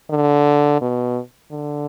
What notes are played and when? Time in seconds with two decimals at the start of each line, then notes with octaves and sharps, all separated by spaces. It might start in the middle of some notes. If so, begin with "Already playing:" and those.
0.10 D3
0.81 B2
1.52 D3